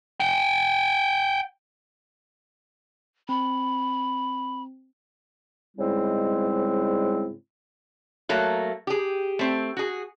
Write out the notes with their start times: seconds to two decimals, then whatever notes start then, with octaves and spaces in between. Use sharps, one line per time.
0.20 F#5 G5
3.29 C4 B5
5.77 G#2 C#3 G3 G#3 C4 E4
8.29 F#3 A3 A#3
8.87 G4 G#4
9.39 A3 C4
9.77 F#4 G#4